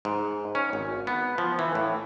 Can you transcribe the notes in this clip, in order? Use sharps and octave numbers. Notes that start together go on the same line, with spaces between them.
G#2
C#4
G#1
B3
F3
E3
A2